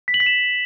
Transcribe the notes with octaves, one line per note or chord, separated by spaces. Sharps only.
B6
F#7
B6
E7